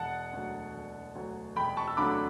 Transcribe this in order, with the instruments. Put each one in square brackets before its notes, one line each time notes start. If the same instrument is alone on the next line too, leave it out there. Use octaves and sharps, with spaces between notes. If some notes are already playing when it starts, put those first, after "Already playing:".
Already playing: [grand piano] E1 F#5 A5
D2 D3 F#3
E1
D2 D3 F#3
E1 G5 B5
A5 C#6
E6
D2 D3 F#3 B5 D6